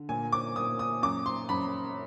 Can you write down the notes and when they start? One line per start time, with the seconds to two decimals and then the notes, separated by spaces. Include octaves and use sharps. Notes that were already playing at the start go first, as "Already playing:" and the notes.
Already playing: D3
0.09 A#2 G#5
0.32 D6
0.56 A#2 D#6
0.79 D#6
1.02 F#2 D6
1.26 C6
1.49 F#2 B5